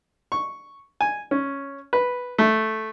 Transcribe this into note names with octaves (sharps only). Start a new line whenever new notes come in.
C#6
G#5
C#4
B4
A3